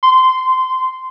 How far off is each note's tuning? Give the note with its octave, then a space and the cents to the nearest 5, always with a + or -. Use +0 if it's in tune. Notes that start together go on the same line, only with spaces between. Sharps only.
C6 -20